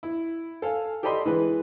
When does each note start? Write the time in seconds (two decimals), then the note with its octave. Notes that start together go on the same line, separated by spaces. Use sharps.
0.03 E4
0.62 A4 F5 G#5
1.03 G4 A4 D5 D#5 B5 C6
1.25 E3 G#3 B4